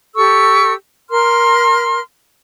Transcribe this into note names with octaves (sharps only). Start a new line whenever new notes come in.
G4 A4 C#6 E6
A#4 C6 F6